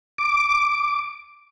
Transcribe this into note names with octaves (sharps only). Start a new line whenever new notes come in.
D6